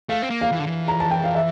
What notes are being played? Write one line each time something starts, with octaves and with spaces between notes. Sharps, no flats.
A3 F5
C4
A#3
F5
E3
D3
E3
A#5
A5
G5
F5
E5